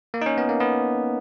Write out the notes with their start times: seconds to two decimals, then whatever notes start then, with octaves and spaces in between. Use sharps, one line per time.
0.14 A#3
0.21 D#4
0.26 C#4
0.38 B3
0.49 A#3
0.60 B3